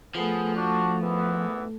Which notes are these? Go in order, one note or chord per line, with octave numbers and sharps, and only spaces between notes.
F3 A3 B3 G#4 A4
D4 F#4
G#1 E3 B3